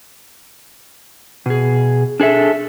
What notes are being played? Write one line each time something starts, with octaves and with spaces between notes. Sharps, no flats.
B2 G#4
D4 G#4 A4 E5